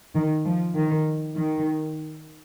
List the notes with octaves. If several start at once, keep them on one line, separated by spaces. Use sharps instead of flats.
D#3
F3
D#3
D#3